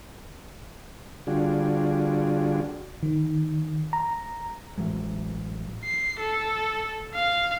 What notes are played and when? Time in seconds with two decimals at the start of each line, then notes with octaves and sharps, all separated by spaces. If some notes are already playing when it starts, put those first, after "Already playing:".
1.27 D3 G3 D4 F4 F#4 G#4
3.03 D#3
3.93 A#5
4.78 A1 E3 F#3 G#3
5.84 C7
6.20 A4
7.15 F5